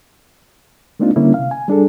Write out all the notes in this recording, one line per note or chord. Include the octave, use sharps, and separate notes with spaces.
G#3 A#3 C4 D4 D#4 F4
D3 G3 A#3 C#4 E4
C3 F5
G#5
G3 D4 G#4 A4